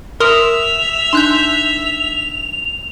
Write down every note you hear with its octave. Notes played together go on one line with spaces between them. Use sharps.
A#4 E5 C6 D#6 F7
D4 D#4 C6 F#6 G6